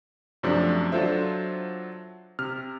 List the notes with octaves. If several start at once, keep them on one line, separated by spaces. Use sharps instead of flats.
F#2 C3 F3 A3 D4
F#3 D4 F4 A4 C5 E5
C3 F6